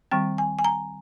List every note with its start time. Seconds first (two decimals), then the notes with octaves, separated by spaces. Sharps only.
0.11 D#3 G3 C4 G5
0.38 G#5
0.59 G#5
0.64 A#5